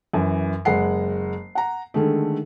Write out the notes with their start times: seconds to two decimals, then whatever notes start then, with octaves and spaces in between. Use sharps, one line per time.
0.13 F#2 E3
0.65 F#1 G#3 F#5 C7
1.55 F#5 A#5
1.94 D3 D#3 G#3 A3